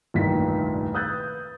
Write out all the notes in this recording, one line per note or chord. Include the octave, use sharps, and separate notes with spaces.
F1 C2 G2 A#2 D#3 B6
B4 D#6 E6 F#6 G6 A6